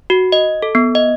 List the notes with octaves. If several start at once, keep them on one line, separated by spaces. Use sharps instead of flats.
F#4
D#5
A4
B3
D#5